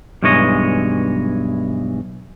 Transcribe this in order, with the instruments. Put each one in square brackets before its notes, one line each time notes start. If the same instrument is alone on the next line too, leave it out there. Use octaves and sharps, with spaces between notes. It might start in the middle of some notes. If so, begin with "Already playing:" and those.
[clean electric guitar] B1 G2 E3 G#3 C#5 D#5